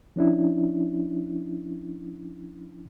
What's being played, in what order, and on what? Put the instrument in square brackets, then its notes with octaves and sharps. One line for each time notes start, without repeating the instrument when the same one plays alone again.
[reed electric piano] F3 C#4 D4 E4